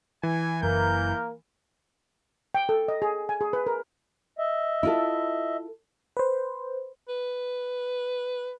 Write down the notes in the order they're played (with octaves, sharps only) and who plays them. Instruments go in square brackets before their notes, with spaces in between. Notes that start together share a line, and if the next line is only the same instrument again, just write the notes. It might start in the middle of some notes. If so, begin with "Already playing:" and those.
[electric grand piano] E3 [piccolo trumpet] G#5
[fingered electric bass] F#1 F#2 [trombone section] A#3 A#4 [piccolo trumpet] G6
[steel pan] G5
A4
D#5
G#4
G#5
G#4
B4
A#4
[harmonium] D#5 E5
[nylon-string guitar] E4 F4 A4
[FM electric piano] B4 C5
[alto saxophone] B4